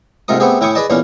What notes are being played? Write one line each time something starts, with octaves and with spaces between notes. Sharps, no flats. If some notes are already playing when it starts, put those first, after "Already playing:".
G#2 C3 A3 F4 A#4 D#6
A3 B3 C4 G4 G#4
A2 E4 G5 G#5 C#6 D#6
G#4 B4 D5 D#5 A5
E2 A#2 E3 C#4 D4